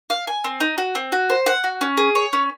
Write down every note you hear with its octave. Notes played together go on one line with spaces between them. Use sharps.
F5
G#5
C4
D#4
F#4
C4
F#4
C5
F#5
F#4
C#4
G#4
C#5
C#4